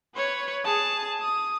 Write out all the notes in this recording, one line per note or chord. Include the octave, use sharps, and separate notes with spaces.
B4 C#5
G#4 A5
D#6